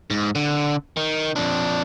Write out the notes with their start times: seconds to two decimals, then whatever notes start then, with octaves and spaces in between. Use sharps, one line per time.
0.10 G#2
0.35 D3
0.97 D#3
1.36 F2 D4